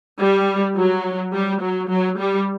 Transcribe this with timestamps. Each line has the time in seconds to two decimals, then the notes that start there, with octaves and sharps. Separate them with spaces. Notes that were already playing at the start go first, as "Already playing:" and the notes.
0.21 G3
0.77 F#3
1.34 G3
1.61 F#3
1.89 F#3
2.18 G3